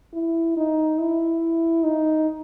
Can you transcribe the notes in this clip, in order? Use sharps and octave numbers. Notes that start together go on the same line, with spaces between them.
E4
D#4
E4
D#4